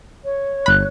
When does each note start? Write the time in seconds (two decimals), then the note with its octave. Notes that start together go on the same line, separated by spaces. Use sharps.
0.24 C#5
0.66 G1 B5 F#6